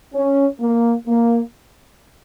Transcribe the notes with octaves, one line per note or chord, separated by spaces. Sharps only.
C#4
A#3
A#3